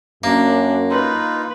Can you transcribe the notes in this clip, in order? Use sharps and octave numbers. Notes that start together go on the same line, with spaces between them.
F#2 A#3 D4
D#4 F4 B4